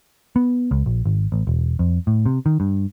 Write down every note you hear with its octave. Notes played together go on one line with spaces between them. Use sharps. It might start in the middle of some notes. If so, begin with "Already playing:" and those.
B3
C#2
A#1
G#1
A1
E1
F2
A2
C3
D#3
G2